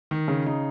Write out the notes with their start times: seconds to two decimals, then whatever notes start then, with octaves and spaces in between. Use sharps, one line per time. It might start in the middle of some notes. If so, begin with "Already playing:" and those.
0.11 D#3
0.28 C#3
0.46 D#4